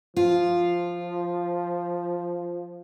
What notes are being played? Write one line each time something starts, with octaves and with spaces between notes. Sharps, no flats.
F3 F4